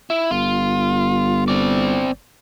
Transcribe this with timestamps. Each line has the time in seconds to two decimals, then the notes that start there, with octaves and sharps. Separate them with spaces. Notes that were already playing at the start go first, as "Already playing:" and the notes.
0.10 E4
0.31 G1 F4
1.48 C4 D5